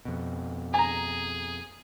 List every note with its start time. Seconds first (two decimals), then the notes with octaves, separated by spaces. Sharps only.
0.05 F2 B2
0.74 G#4 G#5 A#5